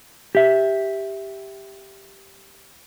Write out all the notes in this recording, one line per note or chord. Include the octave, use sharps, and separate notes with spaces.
G4 E5